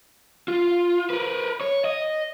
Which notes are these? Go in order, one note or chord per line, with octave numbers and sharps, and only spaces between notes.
F4
A#4 B4
C#5
D#5